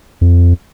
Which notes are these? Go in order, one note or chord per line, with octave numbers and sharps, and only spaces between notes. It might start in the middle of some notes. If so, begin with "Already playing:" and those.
F2